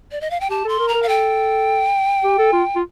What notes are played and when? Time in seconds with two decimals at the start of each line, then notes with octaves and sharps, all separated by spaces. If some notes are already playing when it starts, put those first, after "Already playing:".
0.12 D5
0.21 D#5
0.31 F5
0.41 G5
0.50 G4 A5
0.65 A4 C6
0.79 A#4
0.88 A#5
0.94 A#4
1.03 F5
1.07 A4 G5
2.24 G4
2.39 A4
2.53 F4
2.76 F4